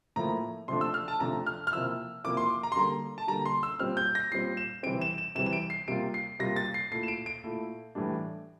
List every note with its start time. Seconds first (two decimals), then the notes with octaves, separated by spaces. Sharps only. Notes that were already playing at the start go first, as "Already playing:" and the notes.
0.16 A2 F3 A#3 E4 A#5
0.68 C3 F3 A3 D4 C6
0.81 E6
0.94 F6
1.08 A5
1.20 C3 F3 A3 D4 A#5
1.46 F6
1.67 F6
1.72 C3 F3 A#3 E4 E6
2.24 C3 F3 A#3 E4 D6
2.37 C6
2.50 D6
2.63 A#5
2.72 C6
2.76 D3 G3 A#3 A#5
3.18 A5
3.28 D3 G3 A#3 A#5
3.45 C6
3.63 E6
3.79 A#2 G3 C4 F6
3.97 G6
4.15 A#6
4.32 A#2 G3 C4 C7
4.57 E7
4.83 C3 E3 G3 C4 D7
5.01 E7
5.18 E7
5.35 C3 E3 G3 C4 E7
5.46 E7
5.53 D7
5.70 C7
5.88 C3 G3 A#3 F4 D7
6.14 C7
6.40 C3 G3 A#3 F4 A#6
6.56 A6
6.74 C7
6.92 A#2 A3 E4 C7
7.03 E7
7.08 D7
7.26 D7
7.44 A#2 A3 E4
7.95 A2 E3 G3 D4